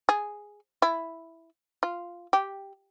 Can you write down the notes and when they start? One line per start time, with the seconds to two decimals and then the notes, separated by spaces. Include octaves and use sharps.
0.09 G#4
0.82 E4
1.83 F4
2.33 G4